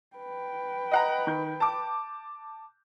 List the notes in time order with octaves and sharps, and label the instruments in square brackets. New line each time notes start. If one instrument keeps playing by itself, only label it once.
[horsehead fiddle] B4 G5
[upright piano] D#5 F#5 A#5
D#3 G6
A5 D6